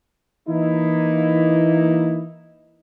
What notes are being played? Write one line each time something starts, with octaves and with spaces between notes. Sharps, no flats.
E3 A#3 D#4 E4